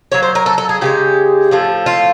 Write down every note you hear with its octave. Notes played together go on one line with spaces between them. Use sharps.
D3 F#3 A#3 C#5
C5
A#4
A4
A4
G#4
C#3 F3 G#3 G4
A2 F3 A3
F4